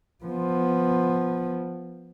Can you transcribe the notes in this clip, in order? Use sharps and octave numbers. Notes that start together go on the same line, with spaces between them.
F3 B3